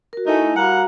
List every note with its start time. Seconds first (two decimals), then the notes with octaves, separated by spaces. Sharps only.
0.13 F#4 A#4
0.27 A3 D#4 E4 G#5
0.56 G3 F#4 A#4 F5 F#5 A#5